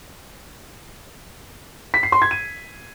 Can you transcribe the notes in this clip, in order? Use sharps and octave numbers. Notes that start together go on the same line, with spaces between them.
B6
C7
C6
G#6
D#7